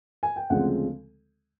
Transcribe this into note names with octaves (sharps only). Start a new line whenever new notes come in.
G#5
G5
D2 C#3 F3 G#3 C4 F#5